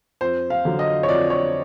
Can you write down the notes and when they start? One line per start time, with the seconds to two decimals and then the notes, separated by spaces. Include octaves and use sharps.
0.21 F2 C5
0.50 F5
0.65 D3 F#3
0.79 D#5
1.03 C#5
1.08 F2 D5
1.30 C#5